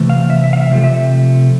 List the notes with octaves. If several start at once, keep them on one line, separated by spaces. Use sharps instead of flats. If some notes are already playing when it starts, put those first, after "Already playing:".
Already playing: C3 E3 A3
F5
E5
E5
F5
E5
C3 F3 A3
E5